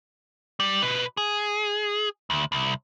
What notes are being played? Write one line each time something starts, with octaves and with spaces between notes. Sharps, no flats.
G3
B2 B4
G#4
D2
C2